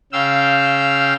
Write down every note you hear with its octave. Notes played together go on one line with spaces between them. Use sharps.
C#3 F5 G5 E6